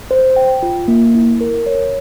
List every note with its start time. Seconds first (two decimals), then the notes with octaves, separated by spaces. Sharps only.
0.11 C5
0.36 G5
0.63 F4
0.88 A#3
1.15 E4
1.41 A#4
1.66 C#5